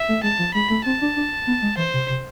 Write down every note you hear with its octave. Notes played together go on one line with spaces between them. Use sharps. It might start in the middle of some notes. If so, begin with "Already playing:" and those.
Already playing: E5
A3
G#3 A5
F3
G#3 B5
A3
C4 A5
D4
D4
B3
G#3
E3 C5
C3
C3